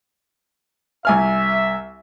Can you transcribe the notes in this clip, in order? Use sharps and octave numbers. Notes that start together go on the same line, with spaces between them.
C2 E5 G#5 F6